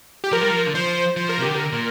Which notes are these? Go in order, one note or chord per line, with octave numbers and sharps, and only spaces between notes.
G4
F3 A#4
G3
F3
D3
F3 C5
F3 C5
A#4
C3
D3 G4
A#4
A#2